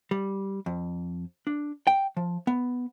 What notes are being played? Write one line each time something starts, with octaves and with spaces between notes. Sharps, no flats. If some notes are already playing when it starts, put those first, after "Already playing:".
G3
F2
D4
G5
F3
B3